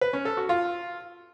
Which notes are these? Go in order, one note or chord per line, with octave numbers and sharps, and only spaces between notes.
B4
C#4
A4
F#4
F4